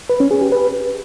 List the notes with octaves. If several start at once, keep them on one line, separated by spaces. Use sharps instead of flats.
B4
C#4
G#4
G4
B4